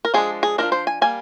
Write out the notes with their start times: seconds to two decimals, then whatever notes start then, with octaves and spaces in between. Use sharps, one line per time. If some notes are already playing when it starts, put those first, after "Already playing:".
0.05 A#4
0.14 F3 G#3 D4 G#4
0.43 G#4
0.58 G#3 D4 A#4
0.63 F3
0.72 C5
0.87 G#5
1.01 G3 A#3 G#5